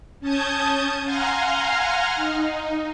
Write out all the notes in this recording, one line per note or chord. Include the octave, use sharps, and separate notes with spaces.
C#4 A5 D#6 G6 G#6
F5 F#5 G#5 A#5 C6 F6
D#4